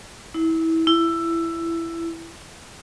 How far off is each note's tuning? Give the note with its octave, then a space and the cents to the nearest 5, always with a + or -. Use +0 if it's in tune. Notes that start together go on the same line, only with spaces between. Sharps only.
E4 -25
E4 +15